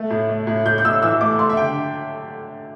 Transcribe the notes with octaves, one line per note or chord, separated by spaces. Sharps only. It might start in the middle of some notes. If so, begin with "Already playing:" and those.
Already playing: A3
A2
A3
A2
A2 G6
G6
A2 E6
E3 E6
A3 D6
A3 C6
E5
D3 G5